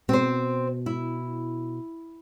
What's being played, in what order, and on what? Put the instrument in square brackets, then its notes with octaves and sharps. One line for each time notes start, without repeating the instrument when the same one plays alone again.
[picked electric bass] B2 [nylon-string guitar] C4 C5
[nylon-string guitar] E4